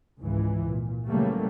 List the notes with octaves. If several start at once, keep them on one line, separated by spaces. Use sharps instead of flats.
G#1 C#2 G#2 E3
A#2
C#3 E3 F#3 G3 A3 A#3